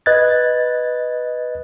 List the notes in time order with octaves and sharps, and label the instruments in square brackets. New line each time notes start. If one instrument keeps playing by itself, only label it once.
[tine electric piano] B4 D#5 F#6 G#6 A6